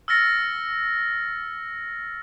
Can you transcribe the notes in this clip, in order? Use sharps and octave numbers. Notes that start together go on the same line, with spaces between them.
E6 F6 A6 A#6 C#7